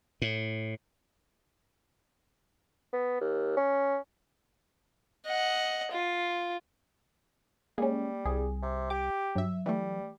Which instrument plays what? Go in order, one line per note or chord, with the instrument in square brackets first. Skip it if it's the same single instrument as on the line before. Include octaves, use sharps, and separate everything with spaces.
[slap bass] A2
[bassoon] B3
D#2
C#4
[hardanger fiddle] D#5 F#5
F4
[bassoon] G3 [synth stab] G#3 C#4 [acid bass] A#3
[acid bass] C2 [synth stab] G#4
[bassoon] C3
[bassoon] G4 [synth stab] D6
[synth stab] G2 E5 [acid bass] F#3
[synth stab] E3 A3 [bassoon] G3